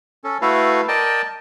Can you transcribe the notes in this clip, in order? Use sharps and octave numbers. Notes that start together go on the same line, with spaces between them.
C#4 A4
A3 E4 F#4 A4 B4 F5
A#4 D5 D#5 G5 A5